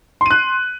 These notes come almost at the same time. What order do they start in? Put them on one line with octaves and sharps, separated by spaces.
C6 D#7 F#6